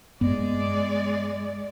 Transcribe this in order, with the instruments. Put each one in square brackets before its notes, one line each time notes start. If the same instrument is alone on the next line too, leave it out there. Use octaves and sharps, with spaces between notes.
[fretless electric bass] G2 B3 [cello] G#3 D5